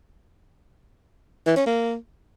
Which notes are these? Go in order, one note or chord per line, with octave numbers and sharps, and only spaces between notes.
E3
C#4
A#3